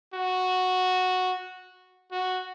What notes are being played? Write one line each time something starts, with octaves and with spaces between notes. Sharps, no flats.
F#4
F#4